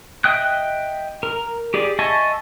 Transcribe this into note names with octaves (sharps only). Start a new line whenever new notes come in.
D#5 E5 G5 D#6 F#6
A#4
G4 G#4 D5
D#5 E5 G#5 A5 C#6